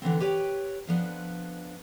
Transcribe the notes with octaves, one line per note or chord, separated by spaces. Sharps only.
D3 E3 B3 C4
G4 B4 C#5 G5
F2 F3 B3 D4